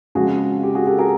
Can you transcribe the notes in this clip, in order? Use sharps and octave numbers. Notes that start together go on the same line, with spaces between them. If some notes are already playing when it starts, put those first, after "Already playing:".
F2 C#3 F3 G#3 F#4 G#4
G4
F#4 G#4
G4 A4
G#4 A#4